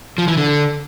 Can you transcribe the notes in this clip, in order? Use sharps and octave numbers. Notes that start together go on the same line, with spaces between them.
F3
E3
D3